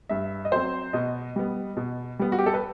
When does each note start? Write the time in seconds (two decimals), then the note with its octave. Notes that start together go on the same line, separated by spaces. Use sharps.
0.09 G2 E5
0.45 D#5
0.52 F#3 C4 C5
0.93 B2 D#5
1.36 G3 B3
1.77 B2
2.19 G3 B3
2.32 F#4
2.38 G4
2.46 A4
2.54 B4